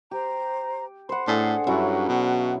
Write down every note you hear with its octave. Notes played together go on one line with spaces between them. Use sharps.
G4 C5 A#5
C5 F#5 B5
A2 D4 G#4 A4 F#5
G2 F#3 C#4 E4
B2